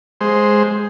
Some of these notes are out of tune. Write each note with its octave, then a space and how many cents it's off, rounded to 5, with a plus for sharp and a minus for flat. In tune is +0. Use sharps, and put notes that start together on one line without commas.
G#3 +0 C5 +0